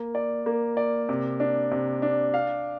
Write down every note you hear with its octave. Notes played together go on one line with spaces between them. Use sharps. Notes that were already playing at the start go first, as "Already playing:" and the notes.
Already playing: A#3
D5
A#3
D5
C3
D4
C3
D4
F5